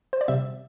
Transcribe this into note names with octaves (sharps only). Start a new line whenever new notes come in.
C5
D5
C3 G3 C4 E5